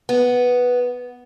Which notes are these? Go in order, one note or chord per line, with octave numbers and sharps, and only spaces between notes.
B3